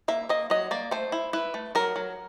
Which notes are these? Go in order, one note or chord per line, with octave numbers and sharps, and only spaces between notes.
A#3 E5
A#3 D#5
F#3 D#5
A#3 D5
A3 C5
E4
E4 B4
A3
F#3 A#4
F#3